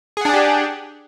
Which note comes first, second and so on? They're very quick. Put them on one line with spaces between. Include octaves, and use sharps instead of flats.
G#4 F#5 D4 D5 G4